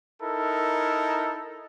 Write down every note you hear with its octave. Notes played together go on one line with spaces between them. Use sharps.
D#4 E4 A4 A#4